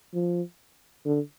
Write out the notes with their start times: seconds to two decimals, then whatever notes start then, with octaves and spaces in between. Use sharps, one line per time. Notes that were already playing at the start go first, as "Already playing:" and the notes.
0.14 F3
1.06 D3